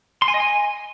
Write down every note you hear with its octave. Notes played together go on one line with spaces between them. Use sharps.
C6
G#5
D#5
G#5